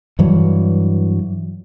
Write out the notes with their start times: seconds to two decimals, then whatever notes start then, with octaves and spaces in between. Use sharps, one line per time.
0.19 G2 E3 F#3